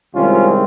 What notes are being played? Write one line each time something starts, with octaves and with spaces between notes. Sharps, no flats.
C2 C3 D#3 G#3 C4 C#4 F4